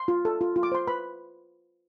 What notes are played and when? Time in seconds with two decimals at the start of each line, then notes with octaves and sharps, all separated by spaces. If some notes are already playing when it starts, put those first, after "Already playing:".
Already playing: C6
0.08 F4
0.25 A4
0.41 F4
0.56 F4
0.63 D6
0.72 C5 C6
0.87 B4 B5